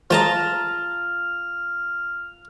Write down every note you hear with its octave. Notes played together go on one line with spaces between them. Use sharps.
F3 G#3 F4 D#5 A5 A#5 F6